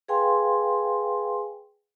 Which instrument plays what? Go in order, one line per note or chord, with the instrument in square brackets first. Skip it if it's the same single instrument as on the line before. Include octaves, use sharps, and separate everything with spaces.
[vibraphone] G#4 B4 F5 G5 G#5 C6